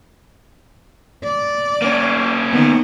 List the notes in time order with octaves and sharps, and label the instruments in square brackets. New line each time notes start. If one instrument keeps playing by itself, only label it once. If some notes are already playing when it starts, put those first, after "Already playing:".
[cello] D5
[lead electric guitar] A#3 C#4
[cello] D#3 B3